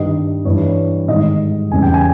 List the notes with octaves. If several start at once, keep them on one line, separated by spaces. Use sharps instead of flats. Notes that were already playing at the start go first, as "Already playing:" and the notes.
Already playing: G2 D#3 G3 D#5
G2 E3 G3 C#5
G#2 D#3 G3 D#5
E2 C#3 G3 G#5
G5
G#5